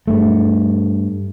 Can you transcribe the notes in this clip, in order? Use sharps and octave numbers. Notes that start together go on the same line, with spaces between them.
G2 A3